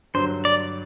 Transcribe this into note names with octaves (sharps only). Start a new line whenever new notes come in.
G2 D3 F#3 C5
D5